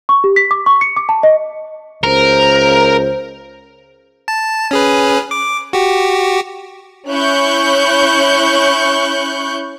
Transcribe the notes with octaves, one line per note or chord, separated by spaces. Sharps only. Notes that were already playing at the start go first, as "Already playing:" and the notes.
C#6
G4
B6
D6
C#6
C#7
D6
A5
D#5
C#2 A#4 C5
A5
C#4 G#4 B4
D6
F#4 G4
C#4 E4 C#6 F#6 G6